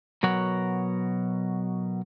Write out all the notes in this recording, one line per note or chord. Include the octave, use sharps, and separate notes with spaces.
B2 F#3 A#4 C#5 F#5